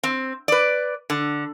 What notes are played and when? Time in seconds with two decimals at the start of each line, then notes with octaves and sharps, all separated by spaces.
0.04 C4
0.48 B4 D5
1.10 D3